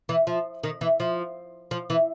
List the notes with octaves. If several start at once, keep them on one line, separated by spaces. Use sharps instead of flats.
E3
F3
D#3
E3
F3
F3
E3